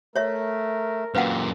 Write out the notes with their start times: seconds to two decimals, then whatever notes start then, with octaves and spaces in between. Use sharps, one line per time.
0.16 A3 A#4 C#5 E5
1.15 F#2 A#2 C4 B4 F5 F#5